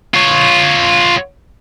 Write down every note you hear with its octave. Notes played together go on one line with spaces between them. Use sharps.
F4 C#5